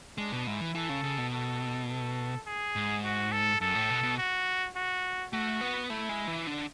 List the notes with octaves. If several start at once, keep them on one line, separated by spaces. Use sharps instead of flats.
G#3 D4
B2
G#2 E4
E3
E3 A4
C#3
C#3
B2
A4
A4
G#4
G#2
F#4
A4
F#2 A4
A2
B2
B2
F#4
F#4
A3 F#4
B3
A3 E4
G#3
E3
D3